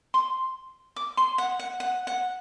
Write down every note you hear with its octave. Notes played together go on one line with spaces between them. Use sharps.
C6
D6
C6
F#5
F#5
F#5
F#5